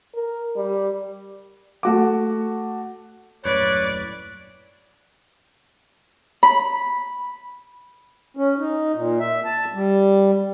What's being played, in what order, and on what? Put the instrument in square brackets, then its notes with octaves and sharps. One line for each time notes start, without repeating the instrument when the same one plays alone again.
[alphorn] A#4
G3
[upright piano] A3 F#4 D6
[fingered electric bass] D#1 F#2 A2 [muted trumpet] B4 [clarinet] C#5 [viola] D5
[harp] B5
[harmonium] C#4
D#4
A#2
E5
A5
G3